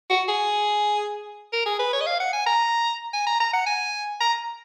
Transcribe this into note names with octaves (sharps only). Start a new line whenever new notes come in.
F#4
G#4
A#4
G#4
B4
C#5
D#5
F5
F#5
G#5
A#5
G#5
A#5
A#5
F#5
G#5
A#5